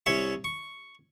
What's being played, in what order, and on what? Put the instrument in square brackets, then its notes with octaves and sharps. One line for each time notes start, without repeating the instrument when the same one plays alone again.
[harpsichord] C2 C#4 C#5 E5 C#6
C#6